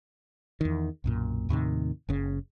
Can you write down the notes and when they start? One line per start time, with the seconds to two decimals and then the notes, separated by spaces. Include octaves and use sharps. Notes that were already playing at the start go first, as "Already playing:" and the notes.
0.61 E2 D#3
1.04 B1 F#2 A#2
1.49 D#2 A2 C3 D#3
2.09 F#1 C#3